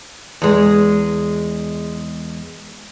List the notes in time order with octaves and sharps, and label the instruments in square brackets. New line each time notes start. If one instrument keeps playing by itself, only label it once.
[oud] E2 G#3